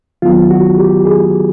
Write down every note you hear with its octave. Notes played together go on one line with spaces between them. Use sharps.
D#3 F#3 B3 F4
F#4
G4
G#4